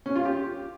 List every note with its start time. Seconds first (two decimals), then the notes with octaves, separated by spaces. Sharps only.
0.06 C#4
0.16 F4
0.25 G4